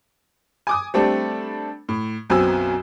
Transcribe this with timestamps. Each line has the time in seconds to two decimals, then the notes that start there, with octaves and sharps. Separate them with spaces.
0.67 G#5 D6 D#6
0.94 G3 A3 C4 D4 A4
1.89 A2
2.30 B1 F#2 B2 C4 G#5 E6